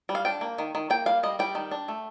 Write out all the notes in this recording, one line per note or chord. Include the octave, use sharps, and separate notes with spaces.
G3
F5
D4 G5
A#3
D#3
D#3
A#3 G5
G3 F5
G3 D#5
G3 G5
D#3
D4
A3